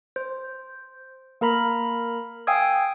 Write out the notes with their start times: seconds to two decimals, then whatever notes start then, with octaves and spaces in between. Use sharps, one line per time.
0.16 C5
1.41 A#3 A#4 A#5 B5
2.47 F5 G5 G#5 D#6 E6 G#6